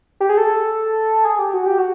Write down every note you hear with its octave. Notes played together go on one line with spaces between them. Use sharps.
G4
G#4
A4
G#4
G4
F#4
G4
F#4